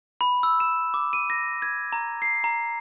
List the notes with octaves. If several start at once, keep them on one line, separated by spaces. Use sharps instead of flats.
B5
E6
E7
D6
D#7
A#6
G#6
A#5
C7
A#5